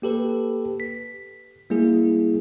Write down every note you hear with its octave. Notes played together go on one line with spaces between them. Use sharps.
A#3 G4 A4 B4
B6
G3 A#3 E4 G#4